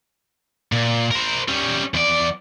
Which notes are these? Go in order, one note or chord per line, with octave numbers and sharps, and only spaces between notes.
A#2
A#4 C5
G3 C#4
E2 D5